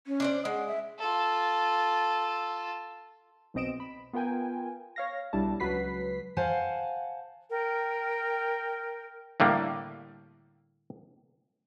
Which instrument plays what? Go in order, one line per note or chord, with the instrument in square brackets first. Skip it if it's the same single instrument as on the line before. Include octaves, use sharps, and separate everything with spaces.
[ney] C#4
[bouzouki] D4 C5 D5
[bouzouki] G#3 [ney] F#5
[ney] E5
[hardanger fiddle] F4 A4
[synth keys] B1 B2 C4 D#5 D7 E7
B5
B3 F4 A#4 G5 G#5
C#5 F5 A#6
B1 G3 D4 E4 A5
C#2 F#3 B4 B6 C7
[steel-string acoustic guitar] C5 F5 F#5 G#5 A5
[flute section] A#4 G5
[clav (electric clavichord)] A2 D3 G3 A#3